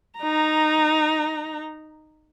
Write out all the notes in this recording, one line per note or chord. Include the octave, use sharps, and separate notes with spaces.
D#4 A#5